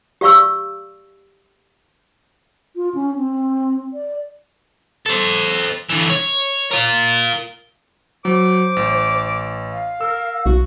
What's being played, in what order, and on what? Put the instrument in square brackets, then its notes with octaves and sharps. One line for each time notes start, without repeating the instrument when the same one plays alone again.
[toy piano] G4 D5 F5 C#6 E6
[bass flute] F4
C#4
C4
D5
[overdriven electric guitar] A4 C5
D3 E3
C#5
F4 A#4
[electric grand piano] F#3 [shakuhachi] C5 [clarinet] D6
[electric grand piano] A1
[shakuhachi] F5
[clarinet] A#4 [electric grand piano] E6
[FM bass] B1 [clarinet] F#4